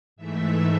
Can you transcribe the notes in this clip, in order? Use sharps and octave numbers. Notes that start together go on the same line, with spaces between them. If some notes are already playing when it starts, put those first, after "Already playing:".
G#2 E3 A3 E5